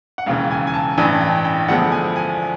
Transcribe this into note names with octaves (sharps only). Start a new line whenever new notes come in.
F#5
E1 D#2 C#3 E3 F5
G#5
G#5
A5
A1 G2 E3 G#5
G5
G5
D2 D3 F3 G#3 B3 F#5
G#5
G#5